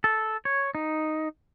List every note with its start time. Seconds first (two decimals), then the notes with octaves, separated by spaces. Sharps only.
0.04 A4
0.45 C#5
0.75 D#4